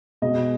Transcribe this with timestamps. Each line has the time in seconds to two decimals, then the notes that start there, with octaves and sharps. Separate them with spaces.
0.22 B2 G#3 D#5